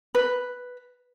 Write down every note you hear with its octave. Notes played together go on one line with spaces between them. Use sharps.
B4